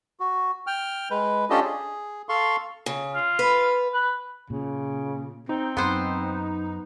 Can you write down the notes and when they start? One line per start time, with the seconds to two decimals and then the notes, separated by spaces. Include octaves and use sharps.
0.20 F#4
0.67 G5 F6
1.11 G#3 B4
1.50 C#4 D4 F4 G4 A4 D#5
1.64 G#4
2.29 A4 F5 C6 C#6
2.86 C#3
3.14 F4
3.39 B4
3.93 B4
4.50 A#2 C#3
5.49 C4 D#4
5.77 F#2 B3 C5